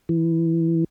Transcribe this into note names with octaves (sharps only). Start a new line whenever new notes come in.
E3